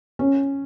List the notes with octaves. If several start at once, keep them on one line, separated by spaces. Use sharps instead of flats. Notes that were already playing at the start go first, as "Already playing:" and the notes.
C#4